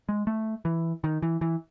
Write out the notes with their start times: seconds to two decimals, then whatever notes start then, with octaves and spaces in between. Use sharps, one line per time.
0.09 G#3
0.27 A3
0.65 E3
1.04 D#3
1.22 E3
1.41 E3